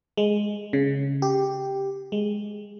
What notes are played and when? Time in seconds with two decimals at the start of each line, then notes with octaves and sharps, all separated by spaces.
0.17 G#3
0.73 C#3
1.22 G4
2.12 G#3